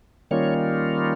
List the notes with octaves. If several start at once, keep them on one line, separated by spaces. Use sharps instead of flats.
D#3 G3 A#3 C#4 F4 C#5